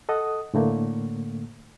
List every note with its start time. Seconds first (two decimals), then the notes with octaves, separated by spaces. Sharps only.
0.09 A4 D#5 F#5 D#6
0.54 A2 D3 A3 A#3